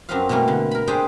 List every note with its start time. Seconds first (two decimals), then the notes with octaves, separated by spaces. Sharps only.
0.09 F#2 F3 F#3 C4 B4 F5
0.29 B2 E3 G3 A3 A#3
0.48 D3
0.71 A#4 B5
0.88 D4 G4 G#4 B4 C5 G5